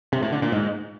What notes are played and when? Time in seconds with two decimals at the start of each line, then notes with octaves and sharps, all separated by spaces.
0.13 C3
0.22 A2
0.32 D3
0.42 A#2
0.52 G#2